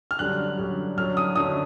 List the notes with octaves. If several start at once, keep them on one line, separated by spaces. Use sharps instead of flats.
F6
F#2 D3 G3 F#6
F#2 D3 G3
F#2 D3 F#3 F6
D#6
F#2 D3 F#3 D#6